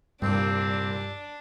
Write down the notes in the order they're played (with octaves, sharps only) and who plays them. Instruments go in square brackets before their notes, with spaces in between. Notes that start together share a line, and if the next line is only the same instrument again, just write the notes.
[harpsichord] C2 A#2 [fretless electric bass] G2 [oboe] C4 [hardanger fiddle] D4